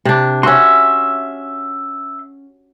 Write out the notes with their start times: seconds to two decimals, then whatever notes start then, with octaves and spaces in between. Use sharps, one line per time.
0.05 C3 D4
0.43 C#4 F#4 E5 C6